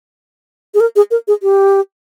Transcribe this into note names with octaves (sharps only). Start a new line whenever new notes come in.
G#4
A#4
G#4
A#4
G#4
G4